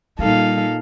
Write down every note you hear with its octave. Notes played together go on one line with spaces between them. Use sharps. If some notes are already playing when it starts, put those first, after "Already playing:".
A#2 G3 D#4 A4 F5